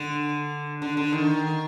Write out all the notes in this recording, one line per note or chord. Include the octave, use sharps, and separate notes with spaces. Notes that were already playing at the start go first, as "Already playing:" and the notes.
Already playing: D3
D3
D3
D#3